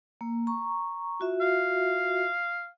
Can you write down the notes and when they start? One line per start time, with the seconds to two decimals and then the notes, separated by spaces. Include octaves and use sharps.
0.21 A#3
0.47 A#5 C#6
1.20 F4 F#4 E5
1.41 F5